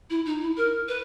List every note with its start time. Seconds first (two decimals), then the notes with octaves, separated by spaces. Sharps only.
0.10 E4
0.25 D#4
0.41 E4
0.57 A#4
0.88 B4